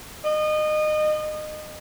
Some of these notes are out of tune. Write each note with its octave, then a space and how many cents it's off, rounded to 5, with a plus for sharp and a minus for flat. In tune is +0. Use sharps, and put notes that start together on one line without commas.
D#5 -25